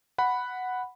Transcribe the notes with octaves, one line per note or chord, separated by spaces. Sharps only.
F#5 B5